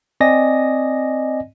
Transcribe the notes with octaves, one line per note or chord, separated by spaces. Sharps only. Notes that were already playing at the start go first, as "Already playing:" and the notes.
C4 D5 D#5 G#5 A#6